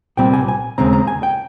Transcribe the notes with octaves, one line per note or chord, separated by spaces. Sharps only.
C2 A#2 G3 C4 G5
G#5
G#5
D#2 C#3 G#3 C4 A#5
A#5
G#5
G5